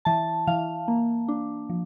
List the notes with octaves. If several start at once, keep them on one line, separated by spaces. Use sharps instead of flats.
E3 A5
E3 F5
A#3
D4
F3